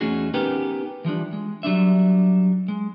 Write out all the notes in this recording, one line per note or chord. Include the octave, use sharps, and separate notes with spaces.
E2 A3 C#4 D#4 F#4 G#4
B3 C#4 D#4 G4 A#4 B4
E3 F3 G3 D4
G#3
F#3 G3 D4 E5
G#3